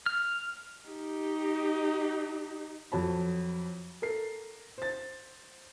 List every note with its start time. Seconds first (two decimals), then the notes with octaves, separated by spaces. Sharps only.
0.06 F6
0.89 D#4 G4
2.92 F2 F#3 C#5 A5 B5
4.02 A4 A#4 C7
4.78 C5 A6